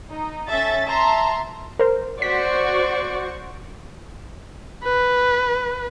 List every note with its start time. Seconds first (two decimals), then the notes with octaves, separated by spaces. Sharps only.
0.11 D#4
0.48 C#4 A4 E5 A6 B6
0.87 E5 A5 A#5 C6
1.79 A#4 C5
2.22 F#4 C5 D5 C#6 B6
4.84 B4